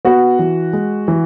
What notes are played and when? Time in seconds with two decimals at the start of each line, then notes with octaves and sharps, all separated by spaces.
0.05 B3 F#4
0.39 E3
0.73 G#3
1.08 E3